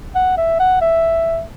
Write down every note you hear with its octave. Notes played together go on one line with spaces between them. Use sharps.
F#5
E5
F#5
E5